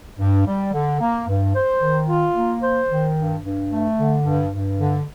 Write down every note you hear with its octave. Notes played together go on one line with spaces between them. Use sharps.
G2
G3
D3
A#3
G2
C5
D#3
F4
A#3
C5
D#3
G2
G2
A3
D3
G2
G2
D3